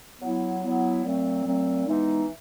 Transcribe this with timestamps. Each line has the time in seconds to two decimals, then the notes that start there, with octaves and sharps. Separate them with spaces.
0.20 F#3 B3 E4
0.61 F#3 B3 E4
1.03 A#2 F#3 A3 C4
1.45 A#2 F#3 A3 C4
1.87 E3 G#3 B3 D#4